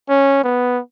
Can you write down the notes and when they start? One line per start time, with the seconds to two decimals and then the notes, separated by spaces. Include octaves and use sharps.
0.09 C#4
0.44 B3